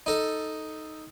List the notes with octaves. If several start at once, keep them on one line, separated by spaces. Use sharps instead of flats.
D#4 A4